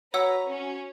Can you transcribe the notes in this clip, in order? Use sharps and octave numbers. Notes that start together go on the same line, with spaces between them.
F#4 B4 C#5 F#5 A#5 E6
C#4